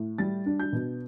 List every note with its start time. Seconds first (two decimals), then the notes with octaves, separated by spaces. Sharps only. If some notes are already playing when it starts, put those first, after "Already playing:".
Already playing: A2
0.18 G3 A6
0.46 D4
0.60 G6
0.73 B2